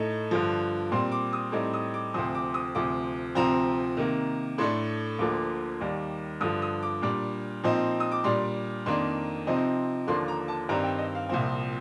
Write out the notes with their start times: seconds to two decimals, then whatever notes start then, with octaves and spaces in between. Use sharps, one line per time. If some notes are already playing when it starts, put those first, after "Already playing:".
Already playing: A2 A3 D#4
0.31 G2 D3 F3
0.91 A#2 G3 C4 C6
1.12 D6
1.33 D#6
1.52 A2 G3 C4 D#4 D6
1.74 D#6
1.94 D6
2.14 D2 C3 F3 C4 D#6
2.35 D6
2.54 D#6
2.75 D2 C3 F3 D6
3.35 D2 C3 F3 C4 A#5
3.97 C3 D#3 A#3
4.58 A2 A3 D4 C6
5.19 D2 D3 F3 A#3 D6
5.81 D#2 D#3 G3
6.41 G2 D3 F3 D#6
6.62 D#6
6.82 D6
7.02 A#2 G3 D4 D6
7.64 A#2 F3 C4 D#4
8.00 D#6
8.12 D6
8.24 A#2 G3 D4 C6
8.86 F2 D#3 A#3 D4 C6
9.47 C3 F3 C4 D#4
10.07 D#2 D3 F3 A#3 D4 C6
10.28 A#5
10.48 A5
10.68 G2 D#3 G3 C4 A#5
10.84 G5
10.99 D#5
11.15 F5
11.29 C2 A#2 F3 C4